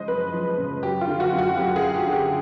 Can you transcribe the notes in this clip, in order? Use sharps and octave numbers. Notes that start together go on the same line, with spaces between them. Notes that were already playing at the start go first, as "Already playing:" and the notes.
Already playing: C#3 F3 G#3 C5 D#5
F#2 B4
F3
C#3
F#3 G4
F4
D3
F#4
F#2
F#4
F#2 G4
G#4
F#3
G4
D3
G4